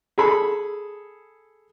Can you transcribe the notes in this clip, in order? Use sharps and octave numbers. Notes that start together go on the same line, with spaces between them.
G#4 A4 B5